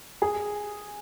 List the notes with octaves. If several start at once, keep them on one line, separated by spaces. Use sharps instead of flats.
G#4